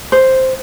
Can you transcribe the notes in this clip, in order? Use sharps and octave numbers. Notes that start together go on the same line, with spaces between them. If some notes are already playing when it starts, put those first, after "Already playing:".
C5